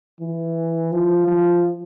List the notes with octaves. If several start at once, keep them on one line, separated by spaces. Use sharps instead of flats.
E3
F3
F3